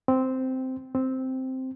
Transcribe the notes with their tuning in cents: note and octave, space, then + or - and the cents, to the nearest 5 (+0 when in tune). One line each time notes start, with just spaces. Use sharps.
C4 -10
C4 -5